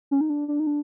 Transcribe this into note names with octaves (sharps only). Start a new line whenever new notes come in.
C#4
D#4
D4
D4
D#4
D4